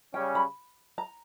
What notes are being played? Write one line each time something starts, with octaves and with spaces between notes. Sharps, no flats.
C#3 G3 C#4 G5
B5
A#5